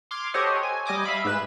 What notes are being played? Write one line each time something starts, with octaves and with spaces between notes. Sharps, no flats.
C6 D6 F6 G#6
G4 A4 C5 C#5 D#5 F#5
G#5
G3 D#5 G#5 D6 D#6
E5 F5 B5
G#2 B4 E7